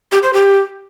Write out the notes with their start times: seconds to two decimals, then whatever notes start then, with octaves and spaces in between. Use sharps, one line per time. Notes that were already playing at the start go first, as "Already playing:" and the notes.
0.12 G4
0.23 C5
0.33 G4